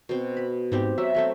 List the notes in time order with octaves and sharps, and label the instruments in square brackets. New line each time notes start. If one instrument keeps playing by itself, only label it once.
[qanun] B2 C4
B5
[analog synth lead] G#2 [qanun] B3 C4 G4
[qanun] F#3 [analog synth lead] E5
[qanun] F#3 A3 C4